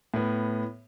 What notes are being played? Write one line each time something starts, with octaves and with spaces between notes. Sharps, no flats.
A2 B3